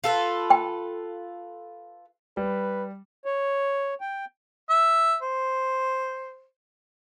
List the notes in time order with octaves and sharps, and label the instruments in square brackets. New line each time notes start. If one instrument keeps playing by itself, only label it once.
[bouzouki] F4 A4 B4
[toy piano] G5
[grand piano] G3 [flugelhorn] B4
[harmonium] C#5
G5
[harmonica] E5
C5